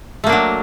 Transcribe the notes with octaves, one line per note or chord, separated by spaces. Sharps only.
F#3 A3 A#3 D4